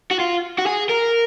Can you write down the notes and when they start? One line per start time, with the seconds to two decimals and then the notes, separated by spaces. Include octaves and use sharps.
0.11 F#4
0.19 F4
0.59 F#4
0.66 G#4
0.89 A#4